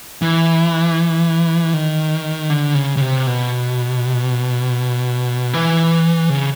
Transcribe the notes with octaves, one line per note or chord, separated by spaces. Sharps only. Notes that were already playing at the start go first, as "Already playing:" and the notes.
E3
D#3
D3
C#3
C#3
C3
B2
E3
C#3